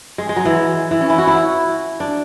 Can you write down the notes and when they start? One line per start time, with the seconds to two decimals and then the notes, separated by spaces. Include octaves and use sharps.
0.18 G#3
0.29 G#3
0.36 F#3
0.45 E3
0.91 E3
1.01 C#4
1.10 E4
1.18 F#4
1.27 E4
2.00 D4